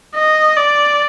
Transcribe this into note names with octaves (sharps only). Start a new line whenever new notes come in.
D#5
D5